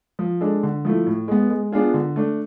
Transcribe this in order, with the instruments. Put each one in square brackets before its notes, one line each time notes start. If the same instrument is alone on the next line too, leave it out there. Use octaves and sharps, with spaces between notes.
[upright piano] F3
G#3 D4 A4
D3
F3 A3 E4
A2
G#3 B3
G#3
B3 D4 F4 G#4
D3
A3 D4